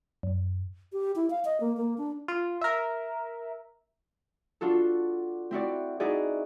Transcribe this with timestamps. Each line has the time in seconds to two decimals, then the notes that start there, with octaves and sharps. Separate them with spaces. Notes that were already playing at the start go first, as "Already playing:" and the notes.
0.23 F#2
0.93 G4
1.16 E4
1.30 F5
1.45 D#5
1.60 A#3
1.77 A#3
1.98 D4
2.28 F4
2.61 A#4 E5
4.61 D4 F4 F#4 A4
5.51 C4 E4 F#4 D5
6.00 D#4 E4 F#4 G#4 D5